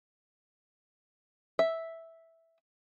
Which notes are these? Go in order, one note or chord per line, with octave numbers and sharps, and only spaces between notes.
E5